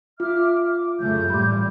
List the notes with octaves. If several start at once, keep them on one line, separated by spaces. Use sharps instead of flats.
F4 E5 D6 F6
D6
F#2 C#3 A3 G6
A1 A#2 G3 B5 C6 D6